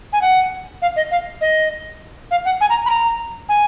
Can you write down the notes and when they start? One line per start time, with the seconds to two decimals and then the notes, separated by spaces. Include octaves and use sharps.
0.13 G#5
0.22 F#5
0.82 F5
0.96 D#5
1.11 F5
1.41 D#5
2.31 F5
2.45 F#5
2.61 G#5
2.70 A#5
2.86 B5
2.90 A#5
3.49 G#5